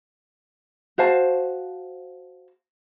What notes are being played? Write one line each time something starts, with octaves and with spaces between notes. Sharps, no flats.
F#4 C5 F5 A5